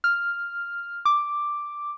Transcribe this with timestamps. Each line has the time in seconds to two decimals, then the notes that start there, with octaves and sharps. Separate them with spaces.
0.04 F6
1.05 D6